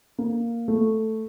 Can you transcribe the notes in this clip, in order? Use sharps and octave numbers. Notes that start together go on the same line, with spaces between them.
A#3
A3